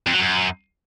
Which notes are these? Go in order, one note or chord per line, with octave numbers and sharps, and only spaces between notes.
F2
F#3
F#2